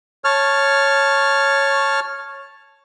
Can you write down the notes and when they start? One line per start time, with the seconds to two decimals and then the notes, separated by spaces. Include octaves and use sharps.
0.24 C#5 A5 F6